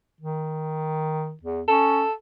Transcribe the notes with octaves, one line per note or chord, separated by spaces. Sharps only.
D#3
E2
C#4 A4